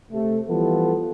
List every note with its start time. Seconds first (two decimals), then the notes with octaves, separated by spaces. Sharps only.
0.11 C3 A3
0.49 E3 F3 G3 B3 F4 A4